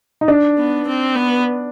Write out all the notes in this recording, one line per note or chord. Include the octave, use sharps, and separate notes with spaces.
D#4
D4
B3
C4
B3